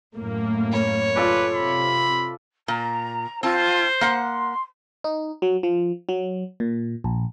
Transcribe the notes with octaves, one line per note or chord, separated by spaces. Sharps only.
F#2 A2 A#3
C#5 B5
F4 A4 B4 D5
C3 B5
A#2 A#5
C4 F4 C5 A5
A#3 F#5 C6
D#4
F#3
F3
F#3
A#2
A#1